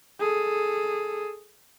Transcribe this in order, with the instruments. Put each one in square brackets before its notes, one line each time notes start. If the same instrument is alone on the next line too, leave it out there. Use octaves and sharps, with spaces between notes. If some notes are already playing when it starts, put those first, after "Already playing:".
[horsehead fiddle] G#4 A4